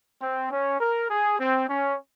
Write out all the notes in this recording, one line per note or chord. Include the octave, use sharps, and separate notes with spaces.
C4
C#4
A#4
G#4
C4
C#4